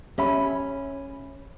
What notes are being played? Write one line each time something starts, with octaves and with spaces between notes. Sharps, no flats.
C#4 G4 E5 B5